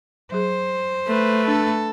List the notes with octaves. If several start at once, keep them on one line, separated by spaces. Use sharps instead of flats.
F#3 G#4 C5
A3 B4
D4 A4